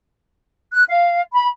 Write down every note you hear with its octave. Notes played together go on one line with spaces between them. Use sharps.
F#6
F5
B5